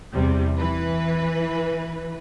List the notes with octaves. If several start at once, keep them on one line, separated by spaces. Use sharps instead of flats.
E2 C3 G3
E3 B4